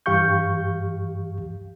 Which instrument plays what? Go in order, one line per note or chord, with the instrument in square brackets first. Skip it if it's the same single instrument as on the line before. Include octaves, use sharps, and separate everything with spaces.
[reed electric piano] G2 E3 G4 F5 C#6 G6